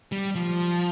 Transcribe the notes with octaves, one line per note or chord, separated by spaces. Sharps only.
G3
F3